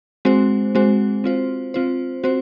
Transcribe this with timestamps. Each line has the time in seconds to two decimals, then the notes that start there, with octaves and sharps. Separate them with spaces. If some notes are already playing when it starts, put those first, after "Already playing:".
0.25 G#3 C4 F#4 C5
0.75 G#3 C4 F#4 C5
1.24 C4 F4 C5
1.74 C4 F4 C5
2.24 C4 F#4 C5